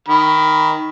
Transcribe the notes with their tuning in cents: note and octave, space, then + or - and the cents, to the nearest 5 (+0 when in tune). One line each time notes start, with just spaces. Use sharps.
D#3 +0 B5 +10